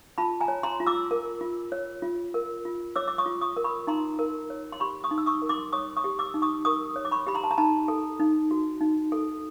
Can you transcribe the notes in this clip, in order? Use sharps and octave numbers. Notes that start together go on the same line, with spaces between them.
F4 A5 B5
G#5 A#5
C#5
A#5 C6
F4
D6 E6
A#4
F4
C#5
F4
A#4
F4
C#5 D6 E6
D6
C#6 D#6
F4
C#6 D#6
A#4
B5 C#6
D#4 A#5 C6
A#4
C#5
C6
G4 B5 C#6
C#6 D#6
D#4
E6
C#6 D#6
A#4
C6 D6
C#5 C#6 D#6
C#6 D#6
G4
D6 E6
D#4
C#6 D#6
A#4 C#6 D#6
C#5
D6
B5 C#6
G4 B5
A#5 C6
A5
A#5
D#4 A5 B5
A4
D#4
F#4
D#4
A4